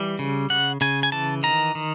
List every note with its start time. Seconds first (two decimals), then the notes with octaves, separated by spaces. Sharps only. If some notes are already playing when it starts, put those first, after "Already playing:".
Already playing: E3 G3
0.19 C#3
0.50 C#3 F#5
0.81 C#3 G#5
1.03 G#5
1.12 E3 A5
1.43 D#3 A#5
1.75 D#3